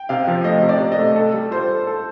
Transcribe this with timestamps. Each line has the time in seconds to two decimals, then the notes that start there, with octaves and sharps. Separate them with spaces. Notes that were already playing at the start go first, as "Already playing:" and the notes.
Already playing: G5
0.09 C3 F5
0.27 F3
0.44 A3 D#5
0.62 C3
0.69 D5
0.80 C3
0.92 D#5
0.99 A3
1.16 A4
1.34 G3
1.51 F4 C5
1.69 A4
1.87 A4